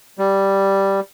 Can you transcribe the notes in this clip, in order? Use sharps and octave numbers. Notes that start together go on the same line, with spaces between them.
G3